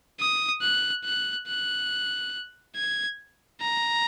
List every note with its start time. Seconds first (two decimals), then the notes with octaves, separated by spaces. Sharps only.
0.20 D#6
0.62 F#6
1.05 F#6
1.48 F#6
2.76 G#6
3.61 A#5